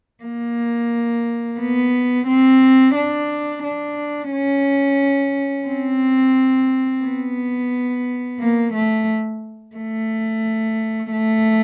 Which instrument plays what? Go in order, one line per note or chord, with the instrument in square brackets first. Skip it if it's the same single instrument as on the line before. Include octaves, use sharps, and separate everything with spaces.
[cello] A#3
B3
C4
D4
D4
C#4
C4
B3
A#3
A3
A3
A3